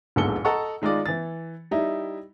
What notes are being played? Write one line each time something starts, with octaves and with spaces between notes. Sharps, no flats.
D1 A#1 G#2 A4 C#7 G7
A4 D#5 F#5 A#5 C#6
D#3 G#3 D#4 F4 D5
E3 A6
G3 D#4 E4